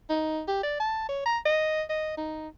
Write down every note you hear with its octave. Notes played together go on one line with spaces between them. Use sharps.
D#4
G4
D5
A5
C#5
A#5
D#5
D#5
D#4